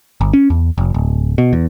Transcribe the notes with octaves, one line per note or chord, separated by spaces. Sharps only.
G1
C#4
E2
F1
D1
B2
E2